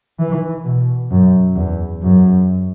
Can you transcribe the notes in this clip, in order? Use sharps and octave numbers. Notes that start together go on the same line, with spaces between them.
E3
B2
F#2
E2
F#2